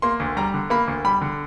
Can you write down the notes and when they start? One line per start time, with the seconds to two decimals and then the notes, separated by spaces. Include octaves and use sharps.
0.02 A#3 C6
0.20 D2
0.37 G3 A#5
0.54 D3
0.70 A#3 B5
0.88 D2
1.04 G3 B5
1.21 D3